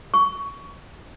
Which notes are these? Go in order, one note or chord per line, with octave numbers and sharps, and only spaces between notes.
C#6